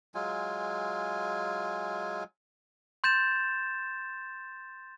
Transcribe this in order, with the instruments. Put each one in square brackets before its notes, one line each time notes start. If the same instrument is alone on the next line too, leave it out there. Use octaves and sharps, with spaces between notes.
[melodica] F#3 G#3 F4 G#5
[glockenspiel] C6 G6 A6 E7